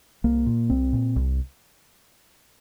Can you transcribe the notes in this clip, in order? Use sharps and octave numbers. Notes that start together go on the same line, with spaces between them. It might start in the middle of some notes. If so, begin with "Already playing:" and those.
C2 A#3
A#2
C2 C4
A#2
C2